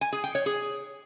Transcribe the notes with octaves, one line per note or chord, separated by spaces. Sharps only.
G#5
G#4
G5
C#5
G#4